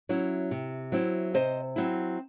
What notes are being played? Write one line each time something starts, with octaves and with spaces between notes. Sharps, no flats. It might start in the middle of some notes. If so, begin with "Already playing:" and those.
F#3 C#4 E4
C3
F#3 C4 E4
C3 C5 D#5
F#3 C4 E4